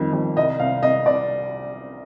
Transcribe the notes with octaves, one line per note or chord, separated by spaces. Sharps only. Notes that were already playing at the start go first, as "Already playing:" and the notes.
Already playing: F2 D#3 G3
F2
C2 D#5
C2 F5
C2 D#5
C2 D5